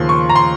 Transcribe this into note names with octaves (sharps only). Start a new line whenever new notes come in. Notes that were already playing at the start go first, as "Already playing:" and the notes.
Already playing: D#2 C#3 F3 C6
C#6
A#5
C6